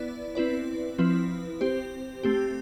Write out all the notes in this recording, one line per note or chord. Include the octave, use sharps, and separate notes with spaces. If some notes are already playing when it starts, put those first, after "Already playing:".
Already playing: B3 E4 B4 D5
C4 E4 B4 D5
F3 C4 E4 B4
C4 G4 C5
A3 C4 G4